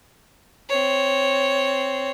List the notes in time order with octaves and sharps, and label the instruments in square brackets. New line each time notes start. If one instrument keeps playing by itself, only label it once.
[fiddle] C4 C#5